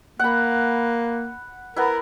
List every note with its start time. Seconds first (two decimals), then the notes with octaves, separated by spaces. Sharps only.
0.19 A#3 F#5 B5
1.76 B3 E4 A#4